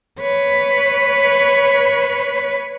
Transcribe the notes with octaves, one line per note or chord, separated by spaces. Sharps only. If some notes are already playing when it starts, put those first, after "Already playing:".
B4 C#5